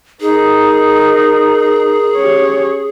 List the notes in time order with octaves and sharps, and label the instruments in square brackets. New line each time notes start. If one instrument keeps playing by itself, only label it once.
[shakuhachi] D#4 [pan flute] G#4 [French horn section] A#4
[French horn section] C#4 [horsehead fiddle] G4 C#5